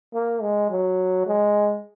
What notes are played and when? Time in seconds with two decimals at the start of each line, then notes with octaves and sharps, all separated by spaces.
0.14 A#3
0.41 G#3
0.71 F#3
1.26 G#3